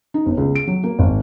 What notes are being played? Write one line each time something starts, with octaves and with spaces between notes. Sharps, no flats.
D#4
G1
C#2
D7
F#3
A#3
G#1